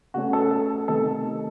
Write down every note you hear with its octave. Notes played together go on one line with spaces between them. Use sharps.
C#3 A3 C#4 F#4
A4
A4
C3 D#3 A3 A4